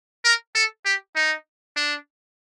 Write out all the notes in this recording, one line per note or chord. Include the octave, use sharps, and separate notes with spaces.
A#4
A4
G4
D#4
D4